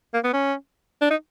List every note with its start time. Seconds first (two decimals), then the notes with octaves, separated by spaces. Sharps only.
0.14 A#3
0.24 B3
0.33 C#4
1.01 D4
1.10 D#4